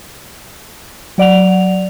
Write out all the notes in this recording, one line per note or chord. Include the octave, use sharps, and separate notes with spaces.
F#3 D5 F#5 F7